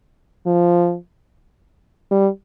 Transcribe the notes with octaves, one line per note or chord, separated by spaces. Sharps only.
F3
G3